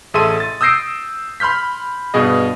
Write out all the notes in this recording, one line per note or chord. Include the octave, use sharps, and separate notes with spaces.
A1 G#4 A4 E5 C6 D#7
A6
D#6 E6 G6 A#6 C7 D7
B5 C6 F6 G6 B6
G2 B2 G#4 D#5